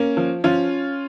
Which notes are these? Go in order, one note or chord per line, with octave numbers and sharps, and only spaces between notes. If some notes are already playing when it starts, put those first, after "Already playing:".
Already playing: A#3 C#4
F3
F3 C#4 F4